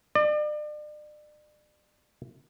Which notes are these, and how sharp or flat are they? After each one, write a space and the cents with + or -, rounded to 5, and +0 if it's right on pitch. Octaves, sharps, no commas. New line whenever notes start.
D5 +40